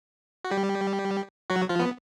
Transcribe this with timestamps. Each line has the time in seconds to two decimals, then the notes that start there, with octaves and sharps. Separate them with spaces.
0.44 F#4
0.51 G3 G4
1.50 F#3 F#4
1.69 F3 F4
1.79 B3